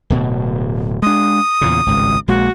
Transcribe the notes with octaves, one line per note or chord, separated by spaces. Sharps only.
D1 B2
G#3 D4 D#6
E2 A#2 C#3
G#1 C#2 G2
A#1 G#3 A#3 F#4